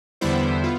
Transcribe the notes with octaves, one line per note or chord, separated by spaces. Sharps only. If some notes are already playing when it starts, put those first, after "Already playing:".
E2 D3 G3 B3 E4 C5 E5
B3 F4